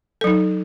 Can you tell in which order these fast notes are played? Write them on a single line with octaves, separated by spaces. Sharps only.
A4 F#3 D#4